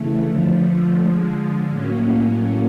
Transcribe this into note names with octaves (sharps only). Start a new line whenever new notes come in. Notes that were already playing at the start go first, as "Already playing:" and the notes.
Already playing: C#3 E3 A3
D3 F3 A3
D3 F3 G#3
A2 F#3 A#3 C#4